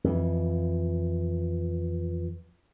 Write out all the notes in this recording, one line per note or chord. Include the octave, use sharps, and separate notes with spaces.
F2 E3